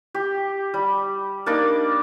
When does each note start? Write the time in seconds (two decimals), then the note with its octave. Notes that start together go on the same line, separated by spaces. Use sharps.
0.14 G4
0.74 G3
1.46 A#3 D4 D#4 D5